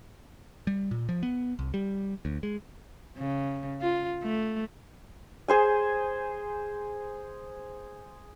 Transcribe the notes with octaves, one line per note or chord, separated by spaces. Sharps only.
G3
A#2
F3
B3
C2
G3
D2
G#3
C#3
F4
A3
G#4 C5 G#5